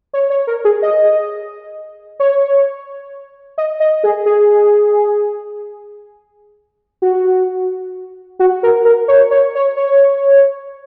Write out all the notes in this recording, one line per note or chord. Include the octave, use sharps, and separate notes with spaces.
C#5
C#5
A#4
G#4
D#5
C#5
D#5
D#5
G#4
G#4
F#4
F#4
A#4
A#4
C#5
C#5
C#5
C#5